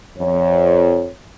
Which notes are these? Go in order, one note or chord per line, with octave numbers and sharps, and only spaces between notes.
F2 C#5